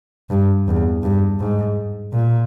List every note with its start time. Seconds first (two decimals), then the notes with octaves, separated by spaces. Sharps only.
0.30 G2
0.67 E2
1.03 G2
1.39 G#2
2.13 A#2